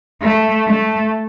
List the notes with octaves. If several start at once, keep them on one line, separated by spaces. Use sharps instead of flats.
A3
A3